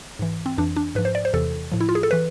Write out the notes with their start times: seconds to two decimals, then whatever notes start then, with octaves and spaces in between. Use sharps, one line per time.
0.19 G#2 E3
0.46 C4
0.58 F2 E3 D4
0.76 D4
0.95 G#2 F3 B4
1.05 C5
1.15 D5
1.25 C5
1.33 E2 C3 E3 A4
1.72 A2 F3
1.81 E4
1.89 F4
1.95 G#4
2.03 A4
2.11 E3 B4